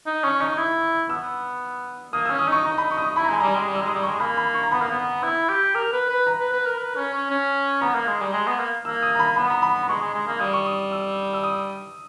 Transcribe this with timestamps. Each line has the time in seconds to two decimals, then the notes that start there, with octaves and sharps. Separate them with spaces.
0.06 D#4
0.24 C#4 C#6
0.40 D#4 C#6
0.58 E4
1.10 B3 E6
2.13 A#3 D#6
2.25 C#4 E6
2.39 D#6
2.48 D#4 C#6
2.65 D#4 A#5
2.78 B5
2.91 C#6
2.97 D#6
3.03 C#6
3.16 E4 B5
3.25 A#5
3.29 G#3 G#5
3.40 G3 A#5
3.55 G#3
3.68 G3
3.75 E6
3.81 G#3 D#6
3.94 G3
4.03 G#3 C#6
4.20 A#3 B5
4.37 B5
4.54 C#6
4.63 A#5
4.72 B3 B5
4.82 A#3
4.91 B3
5.23 E4
5.49 G4
5.75 A#4
5.92 B4
6.10 B4
6.27 A#5
6.40 B4
6.52 B4
6.66 A#4
6.78 B4
6.95 C#4
7.13 C#4
7.31 C#4
7.81 B3 A#5
7.94 A#3
8.07 G#3
8.21 G3
8.33 G#3
8.47 B3
8.59 A#3
8.85 A#3 E6
9.03 D#6
9.15 A#5
9.19 B5
9.36 B3 B5
9.50 A#5
9.62 B5
9.88 G#3 C#6
10.01 G#3
10.14 G#3
10.27 A#3
10.40 G3 D#6
10.53 C#6
10.66 D#6
10.92 E6
11.33 E6
11.43 D#6